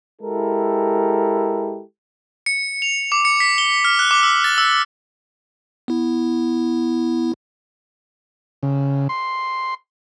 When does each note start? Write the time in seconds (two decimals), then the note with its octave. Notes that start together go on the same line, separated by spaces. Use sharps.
0.22 G#3 E4 G4 A4 A#4
2.46 C#7
2.82 F7
3.12 D6
3.25 C#7
3.40 B6
3.58 G7
3.85 F6
3.99 F#6
4.11 D6
4.23 E6
4.44 A6
4.58 E6
5.88 B3 E4
8.63 C#3
9.09 C6